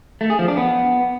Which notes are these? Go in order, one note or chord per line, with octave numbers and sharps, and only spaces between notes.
A3
G#4
F3
D4
B3